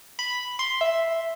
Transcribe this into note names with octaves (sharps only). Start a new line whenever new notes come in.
B5
C6
E5